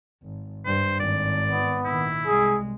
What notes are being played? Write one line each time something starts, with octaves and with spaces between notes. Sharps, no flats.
G#1
G2 C5
G#1 D5
B3
A#1 D#3 E4
C2 G#3 G#4